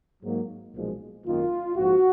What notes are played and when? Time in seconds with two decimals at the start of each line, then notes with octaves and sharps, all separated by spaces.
0.22 G#2 F#3 A#3
0.73 B1 A#2 F3 G#3
1.24 G#1 F#2 D#3 A#3 F4
1.75 A#1 G#2 F3 F#4